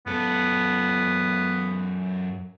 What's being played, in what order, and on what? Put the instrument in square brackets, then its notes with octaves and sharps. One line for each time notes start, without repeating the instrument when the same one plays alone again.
[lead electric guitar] F#2 A4 [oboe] B3